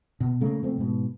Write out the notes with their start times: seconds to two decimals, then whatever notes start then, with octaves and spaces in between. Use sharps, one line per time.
0.20 B2
0.41 C#3 A3 A#3
0.62 C3 F3 A3 C4
0.78 G#2 B2